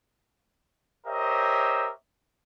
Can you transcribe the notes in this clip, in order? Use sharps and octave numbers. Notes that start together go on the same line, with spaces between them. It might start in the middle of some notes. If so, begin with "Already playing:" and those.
G4 A#4 C5 C#5 D#5 E5